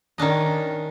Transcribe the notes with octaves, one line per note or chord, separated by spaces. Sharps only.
D#3 C#4 D4 D#5